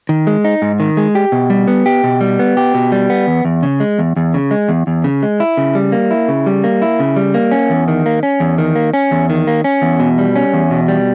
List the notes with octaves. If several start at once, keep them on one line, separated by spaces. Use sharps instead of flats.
D#3
G#3
D#4
G#2
D#3
G#3
G4
B2
G3
B3
G4
B2
G3
B3
G4
B2
G3
B3
E2
E2
C#3
G#3
E2
E2
C#3
G#3
E2
E2
C#3
G#3
E4
C#3
G3
A#3
E4
C#3
G3
A#3
E4
C#3
G3
A#3
C#4
E2
D#3
A#3
C#4
E2
D#3
A#3
C#4
E2
D#3
A#3
C#4
E2
B2
G3
C#4
E2
B2
G3